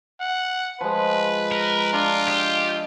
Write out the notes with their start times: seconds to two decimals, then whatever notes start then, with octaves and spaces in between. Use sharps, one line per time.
0.20 F#5
0.81 F3 G#3 B4
1.52 A#4
1.93 D4 F4
2.28 G4 D#5